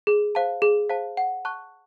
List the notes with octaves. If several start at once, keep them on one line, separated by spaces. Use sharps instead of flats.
G#4
C5 F5 A5
G#4
C5 F5 A5
F#5
A5 C#6 F#6